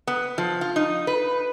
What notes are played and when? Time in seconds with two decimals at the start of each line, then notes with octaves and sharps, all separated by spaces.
0.07 B3
0.38 F3
0.61 F4
0.76 D#4
1.07 B4